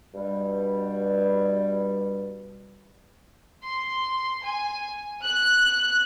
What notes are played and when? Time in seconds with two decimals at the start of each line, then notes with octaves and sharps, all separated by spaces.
0.14 G2 B2 G3
3.63 C6
4.43 G#5
5.24 F#6